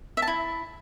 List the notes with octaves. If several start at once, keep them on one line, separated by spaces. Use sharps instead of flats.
E5
A5
E4